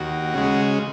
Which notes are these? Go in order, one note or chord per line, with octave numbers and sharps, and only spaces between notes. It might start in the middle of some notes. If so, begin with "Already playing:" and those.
Already playing: D#2 F#4
C#3 G#3